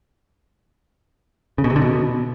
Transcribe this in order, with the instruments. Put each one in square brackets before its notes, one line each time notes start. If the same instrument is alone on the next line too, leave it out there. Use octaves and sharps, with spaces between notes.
[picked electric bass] C#3
B2
C3
D3
B2